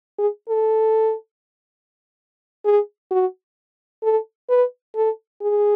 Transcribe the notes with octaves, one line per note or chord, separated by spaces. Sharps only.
G#4
A4
G#4
F#4
A4
B4
A4
G#4